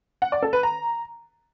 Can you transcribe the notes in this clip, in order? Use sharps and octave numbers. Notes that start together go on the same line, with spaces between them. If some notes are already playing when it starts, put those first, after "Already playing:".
F#5
D5
A4
B4
A#5